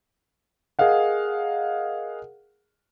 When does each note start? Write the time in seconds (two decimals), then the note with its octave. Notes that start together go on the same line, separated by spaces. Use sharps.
0.79 G#4 A#4 D#5 F5 F#5